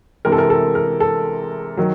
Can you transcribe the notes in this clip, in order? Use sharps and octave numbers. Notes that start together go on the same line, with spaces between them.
C3 E3 G#3 A#4
A4
A#4
A4
A#4
A4
D#3 F#3